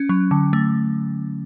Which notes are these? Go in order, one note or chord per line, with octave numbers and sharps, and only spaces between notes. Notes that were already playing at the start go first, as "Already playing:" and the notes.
Already playing: C#4
F#3
D3
A3